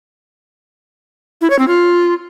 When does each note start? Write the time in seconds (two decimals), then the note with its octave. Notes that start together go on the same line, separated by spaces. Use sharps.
1.41 E4
1.50 C#5
1.59 C4
1.68 F4